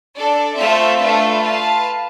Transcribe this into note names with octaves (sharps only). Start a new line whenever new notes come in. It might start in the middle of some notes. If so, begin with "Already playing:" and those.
D4 A4 D5
A3 C4 F4 A4 E5
A3 D4 F4 B4 E5
F4 B4 F5 A5